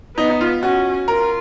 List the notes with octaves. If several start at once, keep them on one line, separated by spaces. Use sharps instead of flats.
B3 D#4
D#4
F4
C#4 F#4
F4 A#4